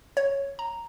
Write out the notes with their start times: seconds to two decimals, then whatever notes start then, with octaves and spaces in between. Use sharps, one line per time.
0.17 C#5
0.59 A#5